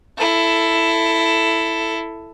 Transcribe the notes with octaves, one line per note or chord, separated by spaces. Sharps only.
E4 A4